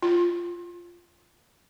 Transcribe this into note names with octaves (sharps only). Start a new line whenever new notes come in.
F4